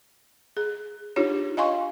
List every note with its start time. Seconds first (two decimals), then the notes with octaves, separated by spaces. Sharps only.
0.57 G#4
1.16 D4 D#4 F4 G4 C#5
1.57 D#5 F5 G#5 C6 C#6